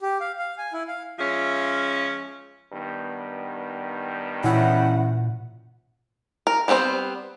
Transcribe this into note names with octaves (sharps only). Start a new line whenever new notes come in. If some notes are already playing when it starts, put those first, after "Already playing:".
G4
F5
F5
G#5
E4
F5
F3 G#3 C#4 F4 E5
G2 D#3 B3
A#2 E3 C#4 E4 F#5
A#4
G3 B3 C4 A4 C5